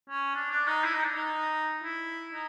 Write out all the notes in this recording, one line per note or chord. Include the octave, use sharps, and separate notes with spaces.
C#4
D4
D4
D#4
E4
D#4
D4
D#4
E4
D#4